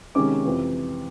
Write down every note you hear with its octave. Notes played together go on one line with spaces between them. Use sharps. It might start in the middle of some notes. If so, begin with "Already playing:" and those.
C3 D#3 G#3 C#4 D6
F2 C3 E3